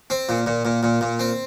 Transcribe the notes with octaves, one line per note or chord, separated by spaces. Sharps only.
C4
A#2
A#2
A#2
A#2
A#2
C4